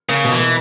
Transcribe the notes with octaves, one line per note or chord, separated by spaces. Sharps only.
C#3 A#3
B2
E3
B2